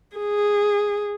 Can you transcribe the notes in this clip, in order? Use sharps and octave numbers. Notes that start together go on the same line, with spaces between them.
G#4